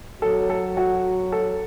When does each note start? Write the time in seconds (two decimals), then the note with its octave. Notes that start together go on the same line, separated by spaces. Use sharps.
0.22 F#3 A4
0.50 A4
0.77 F#4
1.32 A4